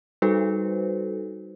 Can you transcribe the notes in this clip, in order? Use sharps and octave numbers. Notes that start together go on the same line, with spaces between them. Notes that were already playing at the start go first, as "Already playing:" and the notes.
G3 D#4 F#4 A4 B4 C5